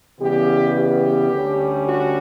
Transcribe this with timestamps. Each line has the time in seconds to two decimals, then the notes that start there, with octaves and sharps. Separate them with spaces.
0.20 C#3 E3 G3 B3 G4
0.76 G4
1.31 D2 D3 G3 C#4
1.87 F#4